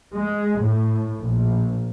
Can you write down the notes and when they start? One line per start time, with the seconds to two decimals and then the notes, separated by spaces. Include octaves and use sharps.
0.12 G#3
0.58 A2
1.20 A#1